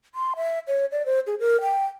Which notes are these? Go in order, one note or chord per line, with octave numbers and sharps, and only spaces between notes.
C6
E5
C#5
D5
C5
G#4
A#4
G5